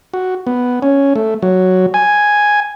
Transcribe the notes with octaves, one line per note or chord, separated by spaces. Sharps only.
F#4
B3
C#4
A3
F#3
G#5